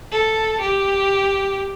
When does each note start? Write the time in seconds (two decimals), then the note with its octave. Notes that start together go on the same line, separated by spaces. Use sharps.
0.12 A4
0.60 G4